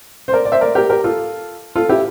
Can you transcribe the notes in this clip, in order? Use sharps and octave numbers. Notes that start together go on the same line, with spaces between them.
C5
A#4 D5
D5
C5 E5
A#4 D5
G4 A#4
G4 A#4
F4 A4
F4 A4
E4 G4